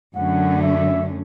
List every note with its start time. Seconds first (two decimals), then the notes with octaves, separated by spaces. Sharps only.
0.15 F#2 D3 F#3 A3 C#4 F#5
0.62 E5